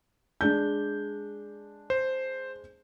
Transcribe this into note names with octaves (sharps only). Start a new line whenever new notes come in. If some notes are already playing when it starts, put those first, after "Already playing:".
G#3 D4 G6
C5